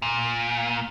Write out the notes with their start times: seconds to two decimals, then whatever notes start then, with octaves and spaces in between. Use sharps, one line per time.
0.02 A#2